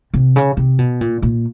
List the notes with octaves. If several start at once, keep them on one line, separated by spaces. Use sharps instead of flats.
C3
C#3
C3
B2
A#2
A#2